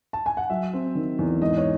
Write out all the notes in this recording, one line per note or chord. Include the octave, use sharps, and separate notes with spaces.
A5
G#5
F#5
F#3 E5
C4
D#3
E2
G#2 D#5
C#5